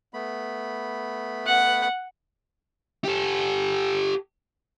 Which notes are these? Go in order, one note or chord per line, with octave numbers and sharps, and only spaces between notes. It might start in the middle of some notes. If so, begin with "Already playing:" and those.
A3 B3 B5
F#5
G4 A4